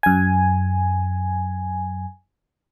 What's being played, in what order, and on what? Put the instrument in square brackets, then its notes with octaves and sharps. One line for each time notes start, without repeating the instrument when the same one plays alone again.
[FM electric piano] F#2 G#5